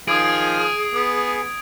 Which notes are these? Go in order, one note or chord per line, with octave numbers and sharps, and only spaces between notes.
D#3 F3 G#4 F5 D#6 G#6 D7
B3